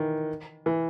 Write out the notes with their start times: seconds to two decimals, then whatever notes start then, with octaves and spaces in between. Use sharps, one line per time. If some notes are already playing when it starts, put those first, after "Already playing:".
Already playing: D#3 E3
0.66 E3